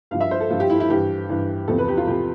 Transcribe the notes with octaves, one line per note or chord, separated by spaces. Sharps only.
G2 F3 F5
E5
C5
A4
G2 F3 F4
G4
E4
E4
G2 E3 G4
G2 E3
E2 C3 F3 A4
B4
G4
F4
C3 F3 G4